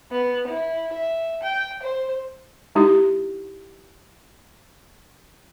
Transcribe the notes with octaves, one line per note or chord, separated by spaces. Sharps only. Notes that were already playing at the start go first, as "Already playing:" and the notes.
B3
E4
E5
G5
C5
G#3 D#4 E4 G4